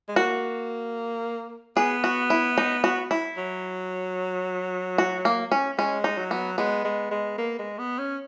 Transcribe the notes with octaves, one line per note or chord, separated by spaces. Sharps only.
G#3
A#3 F#4
B3 G#4
F#4
E4
D#4
F#4
E4
F#3
F#4
A#3
C#4
G#3 C#4
D#4
F#3
B3
G#3 B3
G#3
G#3
A#3
G#3
B3
C#4